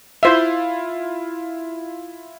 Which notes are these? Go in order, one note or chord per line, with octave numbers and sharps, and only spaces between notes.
E4 F4 C5 E5 F5